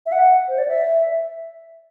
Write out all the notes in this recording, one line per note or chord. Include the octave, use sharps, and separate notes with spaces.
E5
F#5
C5
D5
E5